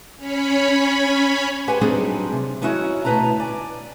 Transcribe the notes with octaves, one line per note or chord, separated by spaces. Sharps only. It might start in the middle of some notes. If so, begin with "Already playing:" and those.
C#4 C#5 B5
G4 B4 C5 F#5 G#5
F#3 G3 C4 D4 D#4 G#4
C3
B3 C#4 D#4 E4 F#4 C#5
D2 B2 B3 B4 A5 A#5
D5 G#5